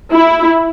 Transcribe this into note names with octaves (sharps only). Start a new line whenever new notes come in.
E4